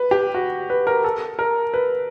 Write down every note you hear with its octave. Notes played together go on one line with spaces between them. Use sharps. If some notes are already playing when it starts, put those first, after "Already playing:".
Already playing: B4
G4
F#4
B4
A#4
A4
A#4
B4